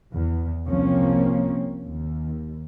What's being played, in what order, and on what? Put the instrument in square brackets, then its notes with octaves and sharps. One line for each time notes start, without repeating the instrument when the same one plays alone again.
[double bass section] E2
C2 F3 A#3 C4 C#4
D#2